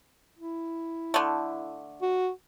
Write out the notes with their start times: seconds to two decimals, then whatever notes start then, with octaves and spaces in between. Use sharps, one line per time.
0.39 E4
1.14 D3 A3
2.02 F#4